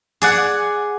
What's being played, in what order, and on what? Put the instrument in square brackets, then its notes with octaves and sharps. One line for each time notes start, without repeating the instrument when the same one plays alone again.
[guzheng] G#4 D5 F#5